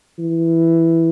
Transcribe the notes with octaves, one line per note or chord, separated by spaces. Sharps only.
E3